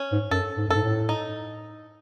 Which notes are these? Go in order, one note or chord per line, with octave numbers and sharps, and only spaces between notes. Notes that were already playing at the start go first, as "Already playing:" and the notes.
Already playing: C#4
G#2
F#2 A4
G#2
F#2
G#2 A4
A2
D#4